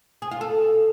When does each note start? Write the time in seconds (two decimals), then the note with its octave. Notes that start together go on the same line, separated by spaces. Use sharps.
0.22 G#4
0.31 F4
0.41 A4